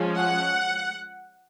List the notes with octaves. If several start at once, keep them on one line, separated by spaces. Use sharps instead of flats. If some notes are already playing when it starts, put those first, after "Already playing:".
Already playing: F3 G#3 C#4
F#5